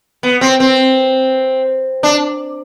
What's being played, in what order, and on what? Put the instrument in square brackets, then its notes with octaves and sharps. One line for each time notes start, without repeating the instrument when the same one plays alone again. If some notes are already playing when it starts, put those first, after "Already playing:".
[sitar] B3
C4
C4
D4